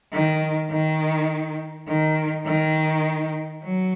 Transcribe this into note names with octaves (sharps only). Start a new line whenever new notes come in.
D#3
D#3
D#3
D#3
F#3